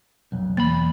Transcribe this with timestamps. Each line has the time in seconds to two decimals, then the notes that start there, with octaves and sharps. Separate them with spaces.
0.32 B1 F2
0.57 E2 A#3 B5